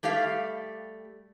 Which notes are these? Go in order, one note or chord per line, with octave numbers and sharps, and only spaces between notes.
G3 A3 G4 F5